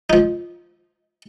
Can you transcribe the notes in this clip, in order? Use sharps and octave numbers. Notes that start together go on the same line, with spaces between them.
F3 D#4